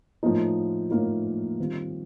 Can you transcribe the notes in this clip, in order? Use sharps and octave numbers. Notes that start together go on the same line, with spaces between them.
A2 F3 A#3 D#4
A2 F3 A#3 D#4
D#3 G3 C4 F4